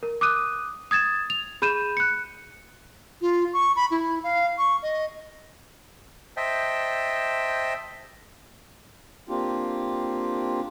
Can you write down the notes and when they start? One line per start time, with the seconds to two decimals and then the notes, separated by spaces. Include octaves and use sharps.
0.03 A#4
0.21 D6 D#6 F#6 D#7
0.91 D#6 G#6 A6 E7
1.30 F7
1.62 G#4 B5 G6 D#7 E7
1.97 F#6 C#7
3.21 F4
3.53 C#6
3.76 B5
3.91 E4
4.24 F5
4.58 C#6
4.83 D#5
6.37 C5 D#5 E5 G5 A5
9.29 A#3 C4 D4 F4 G4